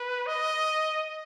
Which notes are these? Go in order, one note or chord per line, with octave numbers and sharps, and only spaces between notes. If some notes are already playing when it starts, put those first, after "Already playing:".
Already playing: B4
D#5